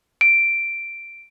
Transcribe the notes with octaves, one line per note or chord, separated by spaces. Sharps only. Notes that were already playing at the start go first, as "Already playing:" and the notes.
D7